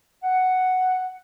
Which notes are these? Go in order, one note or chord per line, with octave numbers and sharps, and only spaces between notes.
F#5